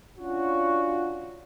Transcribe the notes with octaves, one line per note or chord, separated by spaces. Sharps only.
C#4 D4 F4 F#4